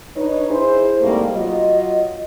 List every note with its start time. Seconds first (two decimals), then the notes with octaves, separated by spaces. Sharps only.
0.16 D4 D#4 B4 C#5
0.49 E4 G#4 C5
1.01 G#2 C3 G3 A3 A#3
1.35 F#3 F4 D#5